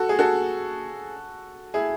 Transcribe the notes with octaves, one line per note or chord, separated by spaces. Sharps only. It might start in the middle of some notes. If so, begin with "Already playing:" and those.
Already playing: F#4 A4
G#4
F#4 A4
E4 G#4